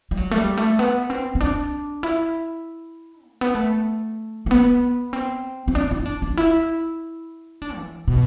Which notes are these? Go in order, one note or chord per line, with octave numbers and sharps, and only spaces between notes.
G3
F#3
A3
G3
A3
B3
C4
C4
D4
E4
A3
B3
A3
A3
B3
C4
C4
D4
E4
D4
D4
E4
D4
E3
B2